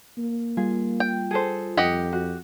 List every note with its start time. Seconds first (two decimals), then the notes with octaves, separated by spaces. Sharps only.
0.18 A#3
0.57 G3 F4 G#4
1.00 G5
1.31 G#4 A4 C5
1.77 F2 G4 D#5 F#5
2.13 F#4